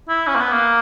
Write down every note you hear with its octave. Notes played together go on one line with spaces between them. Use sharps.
E4
C#4
A#3
B3
A#3